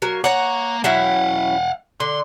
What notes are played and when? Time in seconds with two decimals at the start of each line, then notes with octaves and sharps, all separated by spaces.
0.02 F#3 A#3 A#4
0.24 A#3 C#5 F#5 A#5
0.84 F#3 C#4 E4 F5 F#5
2.00 D3 C6